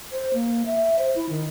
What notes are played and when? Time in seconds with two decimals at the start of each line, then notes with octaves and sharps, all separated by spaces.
0.12 C5
0.34 A#3
0.66 E5
0.99 C5
1.15 E4
1.29 D#3